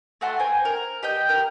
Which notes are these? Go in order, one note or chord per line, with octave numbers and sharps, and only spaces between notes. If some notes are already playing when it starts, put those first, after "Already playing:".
A3 F#4 A5 C6
C5 G5 G#5 A#5
A#4
G4 D#5 G5
A#4